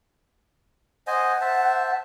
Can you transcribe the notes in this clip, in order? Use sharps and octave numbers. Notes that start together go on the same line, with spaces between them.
C5 D#5 F#5 G#5
C5 E5 A5